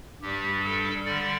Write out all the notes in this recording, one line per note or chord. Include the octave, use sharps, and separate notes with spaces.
G2 G3 G4
A4
D3 G3 D5